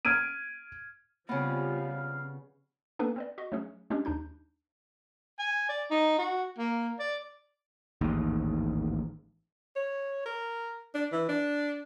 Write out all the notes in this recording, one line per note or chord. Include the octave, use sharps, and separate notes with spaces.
F6 G#6 D7 D#7
C#3 F3 G3 B3 C4 F5
A#3 B3 C#4 D4 A4 B4
C4 B4 D5
F#4 D#5
F#3 A3 C#4 G#4
G#3 C#4 D4 G4
D#2 D4 D#4 G6
G#5
D5
D#4
F#4
A#3
D5
A1 D#2 G#2
C#5
A#4
D4
E3
D4